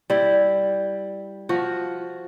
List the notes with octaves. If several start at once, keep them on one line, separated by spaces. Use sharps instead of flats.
G3 E4
F3 F#4